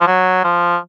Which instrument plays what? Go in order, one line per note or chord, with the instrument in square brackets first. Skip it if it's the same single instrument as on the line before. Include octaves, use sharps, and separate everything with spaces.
[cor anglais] F3
F#3
F3